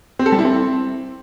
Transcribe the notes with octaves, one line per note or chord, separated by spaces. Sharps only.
C4
A4
G3
E4
C4